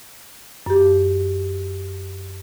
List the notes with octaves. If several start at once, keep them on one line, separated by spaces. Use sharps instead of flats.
F#2 G4